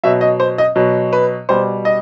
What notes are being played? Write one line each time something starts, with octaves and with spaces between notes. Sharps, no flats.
B2 F#3 E5
D#5
C5
D#5
B2 F#3
B4
B2 G3 C5
D#5